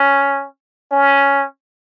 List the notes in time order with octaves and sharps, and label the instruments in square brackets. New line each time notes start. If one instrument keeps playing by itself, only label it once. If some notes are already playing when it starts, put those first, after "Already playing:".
Already playing: [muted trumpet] C#4
C#4